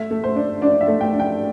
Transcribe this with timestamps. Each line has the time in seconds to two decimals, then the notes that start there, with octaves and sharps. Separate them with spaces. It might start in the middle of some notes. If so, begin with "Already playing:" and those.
Already playing: A3 E5
0.11 A3
0.24 C5
0.36 D4
0.62 D4 D5
0.81 E5
0.88 A3
1.01 G5
1.13 D4
1.20 G5